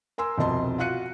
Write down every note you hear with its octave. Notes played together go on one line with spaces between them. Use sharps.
A#4 G#5 C6 E6
C2 F2 B2 D#5 A5 C6
F4 F#4 F5 F#6 C#7 D#7